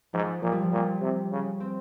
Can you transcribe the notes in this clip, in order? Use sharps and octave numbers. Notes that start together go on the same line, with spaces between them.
G#2 F3
A#2 F3
G3
F3
A#2 G3
C3
C#3
C4